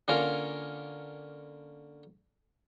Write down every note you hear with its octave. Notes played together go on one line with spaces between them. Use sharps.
D3 A#3 C#4 F4 A#4